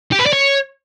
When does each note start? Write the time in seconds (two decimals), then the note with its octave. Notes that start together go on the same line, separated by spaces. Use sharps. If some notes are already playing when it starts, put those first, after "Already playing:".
0.12 G4
0.19 B4
0.26 D5
0.33 C#5